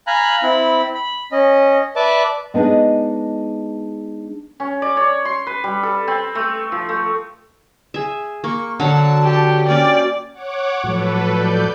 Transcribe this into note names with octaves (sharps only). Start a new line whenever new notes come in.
F5 G#5 A#5 B5 F#6
C4 E4 B5
B5
C#4 D#5
B4 D5 E5 A5 D6
G#3 B3 D4 D#4 G#4 D#5
C#4
D5
C#5
C6
B4
G3
A4
C4
A3
F3
A3
G#4 E5
A#3 C#6
D3 F#3 F#4 F5 F#5 A5
G4
A#3 C#4 A#4 D5 G5
C#5 F#5 D6
A2 F3 F#3 A4 B4
D5 G6